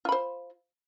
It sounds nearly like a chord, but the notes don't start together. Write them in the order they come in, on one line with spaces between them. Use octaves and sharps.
F4 B5 C5